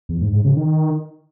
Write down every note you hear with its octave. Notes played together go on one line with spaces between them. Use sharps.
E2
G#2
G#2
C#3
D#3